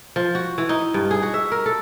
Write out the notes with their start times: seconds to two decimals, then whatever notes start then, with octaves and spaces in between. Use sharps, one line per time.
0.16 F3
0.35 F#4
0.58 E3
0.69 D#4
0.94 G2
1.11 G#4
1.22 F#4
1.34 E5
1.52 A#4
1.66 A4